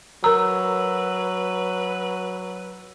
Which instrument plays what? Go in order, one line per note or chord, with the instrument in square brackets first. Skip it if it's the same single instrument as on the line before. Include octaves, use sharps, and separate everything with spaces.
[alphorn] F#3 [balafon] A#4 A#5 [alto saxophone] B4 [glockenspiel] E6